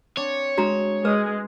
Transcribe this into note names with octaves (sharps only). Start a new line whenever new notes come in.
C4 D4 C#5
G#3 D4 F#4 A#5
G#3 B4 D#6